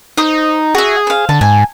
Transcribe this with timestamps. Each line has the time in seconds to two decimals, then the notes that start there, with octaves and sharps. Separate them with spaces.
0.17 D#4 C5 D#6
0.75 F#4 G#4 E5
1.07 C5 F5
1.29 D3 A5
1.41 G#2 G#5